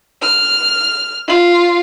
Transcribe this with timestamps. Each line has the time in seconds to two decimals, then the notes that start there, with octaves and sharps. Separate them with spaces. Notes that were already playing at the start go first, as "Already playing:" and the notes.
0.22 F6
1.27 F4